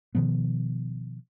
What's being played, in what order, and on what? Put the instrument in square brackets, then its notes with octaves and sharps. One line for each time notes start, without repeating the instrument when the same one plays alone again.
[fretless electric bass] B2 D#3 F3 B3